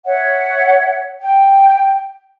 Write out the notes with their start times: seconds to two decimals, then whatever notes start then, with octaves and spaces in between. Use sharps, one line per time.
0.06 C#5 E5 F#5
1.21 G5